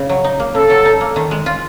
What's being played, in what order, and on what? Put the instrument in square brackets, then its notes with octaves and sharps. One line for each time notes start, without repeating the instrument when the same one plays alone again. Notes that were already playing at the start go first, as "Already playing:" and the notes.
Already playing: [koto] C#3
F#3
D#4
A#3
[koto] C#3 [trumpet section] A4
[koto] F#3
D#4
A#3
D#3
G#3
F4